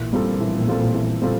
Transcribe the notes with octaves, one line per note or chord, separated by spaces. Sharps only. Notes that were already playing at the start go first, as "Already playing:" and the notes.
Already playing: A#1 A#2 E3
G3 C4 F4 A4
E3
G3 C4 F4 A4
E3
G3 C4 F4 A4